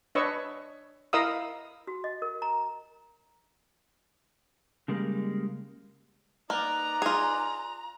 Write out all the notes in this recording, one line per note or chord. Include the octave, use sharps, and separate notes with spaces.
D4 B4 C#5 D#5 C#6 E6
E4 A#4 D#5 F5 D#6 E6
F#4
D#5
A#4
A#5
C#3 G3 G#3 A#3
A#3 D#4 B4 D5 A#5
F4 G#4